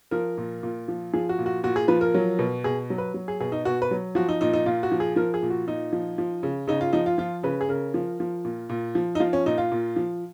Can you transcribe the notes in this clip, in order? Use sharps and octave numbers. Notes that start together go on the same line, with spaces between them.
F3 A#4
A#2
A#2
F3
F3 G#4
F#4
A#2
F#4
A#2 F#4
G#4
F3 B4
A#4
F#3
B2
B2 G#4
F#3
B4
F#3
G#4
B2 G#4
D#4
B2 F#4
B4
F#3
F3 F#4
D#4
A#2 D#4
D#4
A#2 F4
F#4
F3
G#4
F3 A#4
G#4
A#2
F#4
A#2 D#4
F3
F3
C#3
C#3 D#4
F4
F3 D#4
F4
F3 F4
C#3 B4
G#4
C#3 A#4
F3
F3
A#2
A#2
F3
D#4
F3 F4
C#4
A#2 D#4
F4
A#2
F3